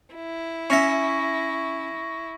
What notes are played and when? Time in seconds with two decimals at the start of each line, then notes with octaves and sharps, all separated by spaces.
0.14 E4
0.70 C#4 E5 C#6 A#6